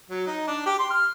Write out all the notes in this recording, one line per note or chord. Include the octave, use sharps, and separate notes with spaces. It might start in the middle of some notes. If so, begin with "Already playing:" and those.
F#3
D#4
D4
G4
C6
F6